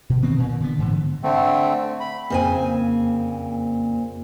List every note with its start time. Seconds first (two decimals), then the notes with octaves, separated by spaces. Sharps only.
0.10 B2
0.22 D#3 B3 C4
0.38 A#2
0.60 D3 B3
0.79 G#2 D3 E3
1.23 D3 A3 C4
2.00 B5
2.30 F2 A#2 C#3 A#3 C4 G#5